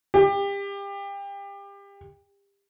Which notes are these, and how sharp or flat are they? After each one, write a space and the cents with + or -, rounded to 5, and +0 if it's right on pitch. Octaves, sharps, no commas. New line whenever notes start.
G4 +30